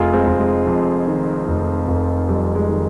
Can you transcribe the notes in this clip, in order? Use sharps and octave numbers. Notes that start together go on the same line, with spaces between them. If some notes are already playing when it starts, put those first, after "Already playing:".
Already playing: F1 F4 G#4
G#3 C4
F1
G#3
F2
D#3
F1
F1
F2 G3
G#3
D#3